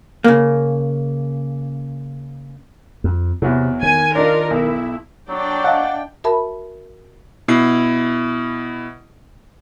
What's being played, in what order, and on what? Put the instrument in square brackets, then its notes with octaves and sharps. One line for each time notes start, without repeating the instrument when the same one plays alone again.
[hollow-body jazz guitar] C#3 A#3
[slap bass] F2
[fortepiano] E2 F#3 [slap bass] C3
[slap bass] D#3 [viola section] G#5
[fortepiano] D4 D#4 D5 [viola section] F4 A#4
[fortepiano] B1 [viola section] E4
[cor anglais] F#3 [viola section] D4 D5 G5
[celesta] D#5 F5 A5 [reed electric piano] F#5
[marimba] F#4 A#4 E5 A5 B5
[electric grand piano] B2 E4 C7